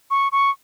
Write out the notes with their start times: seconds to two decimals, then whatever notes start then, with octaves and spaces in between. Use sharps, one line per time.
0.11 C#6
0.32 C#6